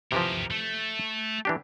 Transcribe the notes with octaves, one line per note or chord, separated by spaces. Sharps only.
C3 E3 F3 G4 A#4
A3
E3 D4 G4